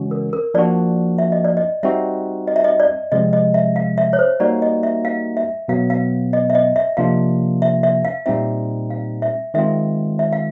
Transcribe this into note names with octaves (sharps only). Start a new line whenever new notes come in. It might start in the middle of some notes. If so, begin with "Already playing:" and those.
Already playing: C#3 E3 G#3 C#4 F#4
A#4
A#4
F3 A#3 D4 F#4 D5
E5
D#5
D5
D#5
G3 C4 D#4 F#4 E5
D#5
E5
D#5
D5
C3 F3 G#3 C4 D#5
D#5
E5
F5
E5
C#5
C5
G3 A#3 D#4 F#4 D5
D#5
E5
F5
E5
B2 F#3 B3 F5
F5
D#5
E5
D#5
E5
C3 F3 A#3 D4 F4 F5
E5
E5
F5
A#2 G3 C4 D#4 E5
F5
E5
D#3 G#3 C4 F4 E5
E5
F5